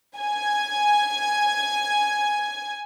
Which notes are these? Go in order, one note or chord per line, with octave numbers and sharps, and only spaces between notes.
G#5 G#6